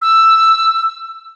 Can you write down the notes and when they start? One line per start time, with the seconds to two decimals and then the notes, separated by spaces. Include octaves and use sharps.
0.02 E6